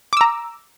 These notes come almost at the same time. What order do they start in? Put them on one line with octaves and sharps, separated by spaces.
D6 E6 A#5